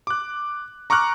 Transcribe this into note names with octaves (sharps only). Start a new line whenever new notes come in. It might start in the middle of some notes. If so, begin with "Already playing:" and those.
D6 F#6
A#5 C#6 D6 F6 F#6